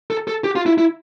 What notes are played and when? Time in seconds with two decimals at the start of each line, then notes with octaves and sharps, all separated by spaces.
0.10 A4
0.28 A4
0.44 G4
0.56 F4
0.66 E4
0.78 E4